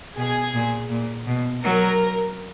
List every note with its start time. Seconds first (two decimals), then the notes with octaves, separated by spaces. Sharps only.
0.17 B2 G#4
0.54 A#2
0.90 A#2
1.27 B2
1.63 F#3 A#4